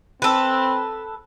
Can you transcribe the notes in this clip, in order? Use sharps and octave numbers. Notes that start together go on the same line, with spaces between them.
C4 A4 B4